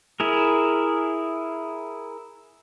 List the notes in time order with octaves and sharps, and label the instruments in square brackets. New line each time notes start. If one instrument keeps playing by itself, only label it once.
[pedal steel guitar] E4 G#4 A#4